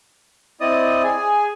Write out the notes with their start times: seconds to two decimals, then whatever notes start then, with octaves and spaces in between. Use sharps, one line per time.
0.61 C4 E4 D5 D#5 D#6
1.04 G#4 G#5